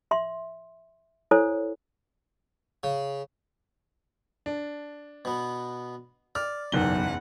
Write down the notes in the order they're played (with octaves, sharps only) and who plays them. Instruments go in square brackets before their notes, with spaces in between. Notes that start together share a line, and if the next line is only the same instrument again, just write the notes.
[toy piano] E5 C6
E4 A4 C5 C#5 G#5
[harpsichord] C#3
[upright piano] D4
[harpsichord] B2 B3
[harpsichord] D5 [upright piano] F6
[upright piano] F#1 G#2 G7 [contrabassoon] B1 [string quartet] E2 F#5